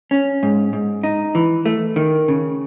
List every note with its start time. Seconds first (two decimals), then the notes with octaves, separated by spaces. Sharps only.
0.11 C#4
0.43 G#2
0.73 G#2
1.04 D#4
1.35 E3
1.66 A3
1.96 D#3
2.28 C#3